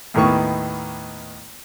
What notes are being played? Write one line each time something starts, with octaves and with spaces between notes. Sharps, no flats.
D#2 A2 D#3 B3 C#6